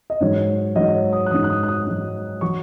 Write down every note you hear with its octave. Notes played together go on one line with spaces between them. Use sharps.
D#5
G#2 F#3 C#5
G#2 F#3 D#5
C#5
D#6
F#6
G#2 F#3 D#6
F#6
D#6
F#6
D#6
G#2 F#3
F#3 C#6